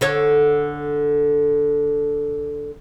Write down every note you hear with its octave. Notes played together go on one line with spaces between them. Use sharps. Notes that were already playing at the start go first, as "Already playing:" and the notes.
D3 A4 C#5